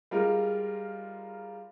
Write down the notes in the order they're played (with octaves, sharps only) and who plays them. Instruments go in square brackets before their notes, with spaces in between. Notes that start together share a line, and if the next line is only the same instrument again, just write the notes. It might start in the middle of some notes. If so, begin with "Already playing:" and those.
[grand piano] G3 G#3 F4 A#4